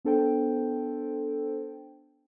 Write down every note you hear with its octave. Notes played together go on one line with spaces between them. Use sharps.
B3 D4 A4 C5 G5